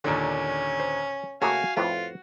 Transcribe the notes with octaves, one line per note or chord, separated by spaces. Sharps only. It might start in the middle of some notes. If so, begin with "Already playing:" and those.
D#2 A#2 D3 C#4
C5
C#3 A3 A#3 F#4 F5 G#5
F2 A2 F4 B4